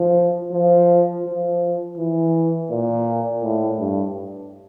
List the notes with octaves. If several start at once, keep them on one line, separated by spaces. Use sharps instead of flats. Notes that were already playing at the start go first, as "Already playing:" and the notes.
Already playing: F3
F3
F3
E3
A#2
A2
G2